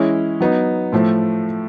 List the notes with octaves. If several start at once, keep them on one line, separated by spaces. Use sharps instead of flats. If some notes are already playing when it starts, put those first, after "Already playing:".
Already playing: E3 G#3 C#4 E4
F#3 B3 D#4
A2 F3 A3